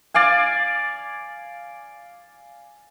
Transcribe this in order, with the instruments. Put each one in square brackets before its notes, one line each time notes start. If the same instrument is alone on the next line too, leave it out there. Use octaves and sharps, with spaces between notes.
[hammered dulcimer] D5 F5 G#5